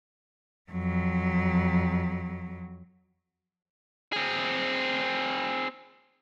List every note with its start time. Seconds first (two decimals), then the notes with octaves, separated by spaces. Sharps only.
0.72 F2 F#3
4.13 C4 G#4